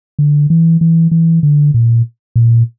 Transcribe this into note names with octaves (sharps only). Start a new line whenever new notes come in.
D3
E3
E3
E3
D3
A#2
A#2